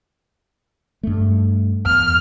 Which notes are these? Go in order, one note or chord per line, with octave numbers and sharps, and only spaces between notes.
G2 A3
E2 F6